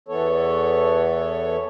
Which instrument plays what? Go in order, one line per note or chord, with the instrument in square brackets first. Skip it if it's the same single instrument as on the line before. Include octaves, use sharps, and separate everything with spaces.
[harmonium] E2 E3 B3 A4 C#5